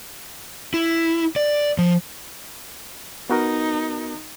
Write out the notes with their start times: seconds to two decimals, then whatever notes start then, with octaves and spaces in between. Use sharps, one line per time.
0.74 E4
1.36 D5
1.78 F3
3.30 B3 D#4 F#4 A#4